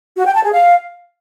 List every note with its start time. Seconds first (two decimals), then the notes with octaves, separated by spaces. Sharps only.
0.17 F#4
0.26 G5
0.35 A5
0.44 G#4
0.53 F5